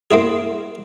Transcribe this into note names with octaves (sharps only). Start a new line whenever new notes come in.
A#3 C4 E4 G#4